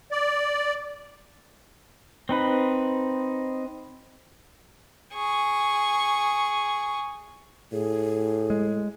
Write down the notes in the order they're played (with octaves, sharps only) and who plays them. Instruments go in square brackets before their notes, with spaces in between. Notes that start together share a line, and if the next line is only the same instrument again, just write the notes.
[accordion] D5
[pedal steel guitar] C4 D#4 B4
[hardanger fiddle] G#4 C#6
[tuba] A2 [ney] G#4
[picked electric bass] G#3